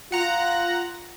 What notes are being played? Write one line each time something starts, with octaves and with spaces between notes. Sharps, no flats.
F4 F#5 A#5